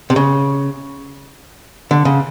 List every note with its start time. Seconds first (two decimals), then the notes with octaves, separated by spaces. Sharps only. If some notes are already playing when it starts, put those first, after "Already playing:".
0.10 C3
0.16 C#3
1.91 D3
2.05 C#3